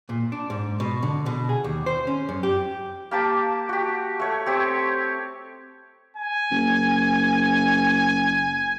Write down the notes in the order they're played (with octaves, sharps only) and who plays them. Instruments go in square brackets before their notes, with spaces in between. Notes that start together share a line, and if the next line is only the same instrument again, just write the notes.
[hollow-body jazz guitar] A#2
D4
G#2
B2
D3
B2
G#4
D#2
C5
C#4
F#2
G4
[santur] A#3 G4 A5 D6
F#4 G4
A3 C#5
C4 G4 C#5
[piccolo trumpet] G#5
[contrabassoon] F#1